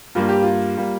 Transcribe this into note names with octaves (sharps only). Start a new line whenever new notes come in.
G2 G3 A#3 F4
G4
F4
G3 A#3